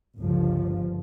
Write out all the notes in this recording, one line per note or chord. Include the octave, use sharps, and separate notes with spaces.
G1 C#2 F3